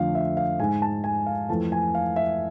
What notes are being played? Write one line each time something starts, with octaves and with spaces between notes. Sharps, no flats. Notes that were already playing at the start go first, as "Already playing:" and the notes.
Already playing: F2 D3 F3 A3 F5
E5
F5
G#2 G#3 G#5
A5
G#5
F5
F2 E3 A3 A5
G#5
F5
E5